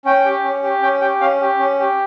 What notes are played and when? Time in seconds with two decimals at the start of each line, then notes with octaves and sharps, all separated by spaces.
0.05 C#4 G5
0.26 G4
0.44 C#4
0.64 G4
0.82 C#4 G5
1.01 G4 G5
1.21 C#4 F5
1.41 G4
1.59 C#4
1.79 G4